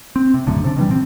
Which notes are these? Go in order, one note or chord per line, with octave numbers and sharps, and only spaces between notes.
C4
C3
B1 F#2 A2 D3
C3 D4
D#3 E3 G3
A#2 C4